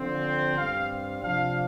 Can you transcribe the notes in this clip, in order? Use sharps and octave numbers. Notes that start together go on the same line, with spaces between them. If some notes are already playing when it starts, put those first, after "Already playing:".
Already playing: D3 F3 C4
G5
G2 G3 C4 F5
F5
C3 F3 D4 F5